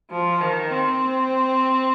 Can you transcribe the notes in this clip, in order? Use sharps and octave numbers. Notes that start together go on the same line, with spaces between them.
F3
D#3
C4